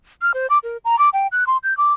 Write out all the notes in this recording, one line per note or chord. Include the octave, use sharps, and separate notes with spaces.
F6
C5
D6
A#4
A#5
D6
G5
F#6
C6
G6
D6